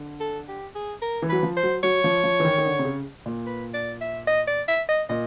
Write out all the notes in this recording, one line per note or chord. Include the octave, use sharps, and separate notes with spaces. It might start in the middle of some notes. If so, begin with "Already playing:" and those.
Already playing: D3
A4
G4
G#4
A#4
E3
F#3 B4
F3
C5
F#3
F#3 C#5
F3
F3
E3
D#3
D#3
D3
C3
C#3
A#2
B4
D5
E5
D#5
D5
E5
D#5
A#2 D#5